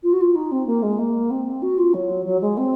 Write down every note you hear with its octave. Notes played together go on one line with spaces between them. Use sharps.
F4
F#4
F4
D#4
C4
A#3
G#3
A#3
C4
F#4
F4
F#3
F#3
G#3
C4